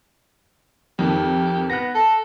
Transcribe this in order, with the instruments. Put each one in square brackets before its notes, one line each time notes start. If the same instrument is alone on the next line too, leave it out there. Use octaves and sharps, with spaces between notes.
[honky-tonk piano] F2 D#3 [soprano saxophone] G4
[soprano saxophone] B3 [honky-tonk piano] F#6 A#6
[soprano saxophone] A4